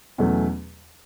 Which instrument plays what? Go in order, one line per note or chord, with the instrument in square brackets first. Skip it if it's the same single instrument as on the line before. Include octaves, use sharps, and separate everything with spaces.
[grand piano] E2 B2 F#3 A3 C#4